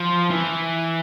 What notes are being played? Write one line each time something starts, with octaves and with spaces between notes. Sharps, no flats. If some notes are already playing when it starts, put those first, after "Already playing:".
Already playing: F3
E3